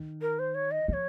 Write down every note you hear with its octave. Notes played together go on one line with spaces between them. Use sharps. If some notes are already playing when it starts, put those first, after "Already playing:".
Already playing: D#3
A#4
C5
C#5
D#5
F3 C#5 D#5